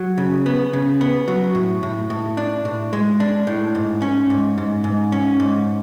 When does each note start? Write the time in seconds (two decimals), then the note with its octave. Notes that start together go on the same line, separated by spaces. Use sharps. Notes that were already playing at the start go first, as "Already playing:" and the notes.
Already playing: F#3
0.18 C#3
0.46 B3
0.73 C#3
1.01 B3
1.28 F#3
1.55 A2
1.83 A2
2.10 A2
2.37 D4
2.65 A2
2.93 G#3
3.20 D4
3.47 A2
3.75 G#2
4.02 C#4
4.30 G#2
4.58 G#2
4.84 G#2
5.12 C#4
5.40 G#2